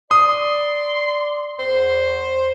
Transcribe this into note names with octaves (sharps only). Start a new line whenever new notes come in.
D5 C6 D#6
E2 C5